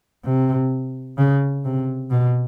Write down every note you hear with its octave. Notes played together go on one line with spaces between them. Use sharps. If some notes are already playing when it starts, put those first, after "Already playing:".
C3
C#3
C3
B2